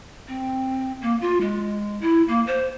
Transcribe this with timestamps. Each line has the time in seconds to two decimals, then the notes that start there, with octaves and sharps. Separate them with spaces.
0.28 C4
1.01 A#3
1.21 F4
1.41 G#3
2.01 E4
2.28 A#3
2.47 C5